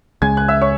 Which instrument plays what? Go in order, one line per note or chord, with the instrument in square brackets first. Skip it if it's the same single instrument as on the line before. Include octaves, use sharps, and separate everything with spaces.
[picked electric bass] C#2 C#3 G#3 [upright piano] G#5 G#6
[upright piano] F#6
E5 E6
C#5 C#6